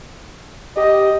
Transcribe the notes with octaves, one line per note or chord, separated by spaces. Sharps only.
G4 D#5